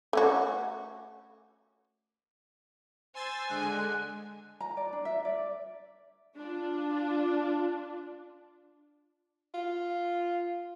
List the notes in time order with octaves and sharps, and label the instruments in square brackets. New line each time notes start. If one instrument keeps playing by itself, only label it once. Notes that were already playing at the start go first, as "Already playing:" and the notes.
[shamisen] A3 C#4 F#4
[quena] C5 [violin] G#5 [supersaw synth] C6 E6 A6
[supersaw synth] D3 G#3 [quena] F#6
[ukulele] A#5
D5
D4
E5
D5
[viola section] D4 F4
[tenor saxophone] F4